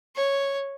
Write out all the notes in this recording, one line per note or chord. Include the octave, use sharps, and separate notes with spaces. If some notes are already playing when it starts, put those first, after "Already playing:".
C#5